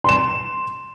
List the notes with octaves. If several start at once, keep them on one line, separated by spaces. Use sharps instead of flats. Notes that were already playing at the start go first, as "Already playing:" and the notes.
C6 E7